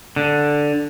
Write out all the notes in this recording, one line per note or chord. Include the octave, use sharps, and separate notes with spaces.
D3